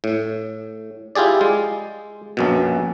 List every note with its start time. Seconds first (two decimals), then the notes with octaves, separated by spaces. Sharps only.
0.04 A2
1.15 E4 F4 G4 G#4 D5
1.41 G#3
2.37 A#1 F#2 B2